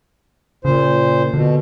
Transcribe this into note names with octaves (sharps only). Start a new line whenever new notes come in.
A#2 C#3 C5
B2 D3